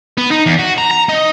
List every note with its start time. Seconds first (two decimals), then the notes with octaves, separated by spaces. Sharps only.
0.18 B3
0.31 D#4
0.46 E2
0.59 F#4
0.78 A#5
0.91 A#5
1.09 D#4